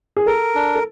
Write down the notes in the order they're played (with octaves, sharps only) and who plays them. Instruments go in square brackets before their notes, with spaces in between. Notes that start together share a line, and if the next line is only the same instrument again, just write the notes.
[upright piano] G#4
[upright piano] A4 [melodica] A#4
[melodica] D4
[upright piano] A4